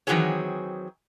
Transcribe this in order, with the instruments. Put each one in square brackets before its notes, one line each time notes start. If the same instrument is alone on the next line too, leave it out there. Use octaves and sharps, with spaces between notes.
[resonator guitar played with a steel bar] D#3 E3 F#3 C4 G#4 C#5